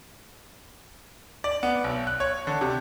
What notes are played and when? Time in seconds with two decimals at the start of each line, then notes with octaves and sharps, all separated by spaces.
1.44 D5
1.63 B3
1.84 B1
2.07 F#6
2.20 C#5
2.47 D3
2.61 C3